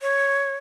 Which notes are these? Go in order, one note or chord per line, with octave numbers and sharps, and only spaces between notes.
C#5